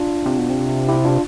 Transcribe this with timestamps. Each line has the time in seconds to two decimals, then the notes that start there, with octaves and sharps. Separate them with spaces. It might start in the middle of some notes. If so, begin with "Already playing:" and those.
Already playing: D4 F4
0.26 C3
0.38 B2
0.50 C3
0.88 E4 G4
1.05 D4 F4